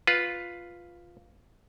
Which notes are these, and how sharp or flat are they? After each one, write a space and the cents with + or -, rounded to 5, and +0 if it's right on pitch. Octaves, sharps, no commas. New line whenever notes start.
F4 +0 B4 +0